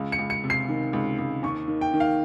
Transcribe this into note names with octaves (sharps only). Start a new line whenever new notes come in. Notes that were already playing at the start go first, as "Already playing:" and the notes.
Already playing: C#2
C#7
C#2
C#7
C3
C7
D#3
C#2
C#2
D#2 C#6
D#3
G5
D#3
F5